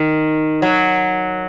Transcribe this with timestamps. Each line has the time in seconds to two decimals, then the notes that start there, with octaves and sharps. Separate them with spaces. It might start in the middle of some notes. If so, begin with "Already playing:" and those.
Already playing: D#3
0.62 F#3